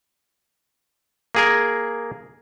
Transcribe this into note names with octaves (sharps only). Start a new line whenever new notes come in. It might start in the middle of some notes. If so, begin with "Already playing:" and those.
A#3 G#4 A#4